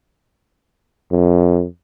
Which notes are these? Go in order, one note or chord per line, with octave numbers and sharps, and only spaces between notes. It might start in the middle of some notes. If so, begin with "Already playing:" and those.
F2